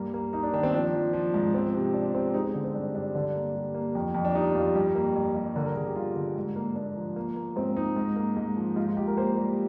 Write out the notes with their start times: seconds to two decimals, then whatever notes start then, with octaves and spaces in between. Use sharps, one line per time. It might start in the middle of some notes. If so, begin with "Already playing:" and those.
Already playing: G2 A#3
0.14 A#3
0.33 A#3 D#4
0.43 D4
0.53 D#3 D4
0.63 C4
0.74 F3 D4
0.94 F3
1.13 F3
1.34 G#2
1.54 F3 C4
1.74 C3
1.94 C3 D4
2.14 C3 C4
2.34 G#3 D#4
2.45 C4
2.54 D3 D4
2.64 C4
2.75 G2 D4
2.94 G2 D4
3.15 D3 D4
3.35 A#3
3.55 G3
3.74 A#3
3.95 F2
4.14 F2
4.25 D4
4.35 G3 D#4
4.55 F2 F4
4.75 G2 G4
4.95 A#3
5.16 G2
5.36 G2
5.56 D3 A#4
5.66 A#4
5.76 D3 G#4
5.86 G4
5.95 G2 F4
6.16 D3
6.36 G#2
6.56 A#3
6.75 A#3 D4
6.96 F3
7.16 A#3
7.36 A#3
7.56 G#2 C4
7.77 G#2 D#4
7.96 G#2
8.16 A#3
8.37 G#2
8.56 F3
8.76 G#2 F4
8.87 F4
8.97 G#2 G4
9.07 A#4
9.17 A#3 C5
9.38 G3